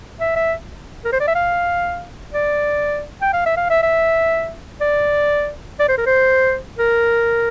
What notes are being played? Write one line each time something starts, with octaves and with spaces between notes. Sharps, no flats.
E5
E5
A#4
C5
D5
E5
F5
D5
G5
F5
E5
F5
E5
E5
D5
D5
C5
A#4
C5
A#4